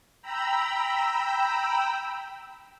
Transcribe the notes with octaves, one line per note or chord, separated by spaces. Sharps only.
G5 A#5 B5 E6